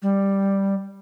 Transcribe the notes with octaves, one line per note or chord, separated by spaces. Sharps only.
G3